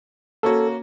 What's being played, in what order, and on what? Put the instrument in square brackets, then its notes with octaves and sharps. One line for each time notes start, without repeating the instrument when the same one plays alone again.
[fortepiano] A#3 C#4 F#4 [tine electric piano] A4